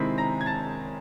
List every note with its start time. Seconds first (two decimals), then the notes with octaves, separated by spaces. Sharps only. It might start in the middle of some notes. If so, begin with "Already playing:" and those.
Already playing: C3 D#3 G#3 C4 E4 B5 B6
0.18 A#5 A#6
0.41 G#6
0.46 A5 A6